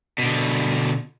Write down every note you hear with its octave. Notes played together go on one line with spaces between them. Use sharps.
B2 D3